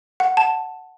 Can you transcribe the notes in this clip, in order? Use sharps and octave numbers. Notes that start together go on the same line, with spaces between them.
F#5
A5